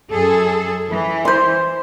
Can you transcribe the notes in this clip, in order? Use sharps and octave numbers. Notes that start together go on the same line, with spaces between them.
F#2 G#4 A4
E3
C5 C6